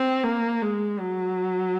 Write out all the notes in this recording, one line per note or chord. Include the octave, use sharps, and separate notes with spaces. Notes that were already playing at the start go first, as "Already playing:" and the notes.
Already playing: C4
A#3
G#3
F#3